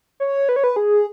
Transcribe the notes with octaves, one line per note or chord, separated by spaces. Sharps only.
C#5
B4
C#5
B4
G#4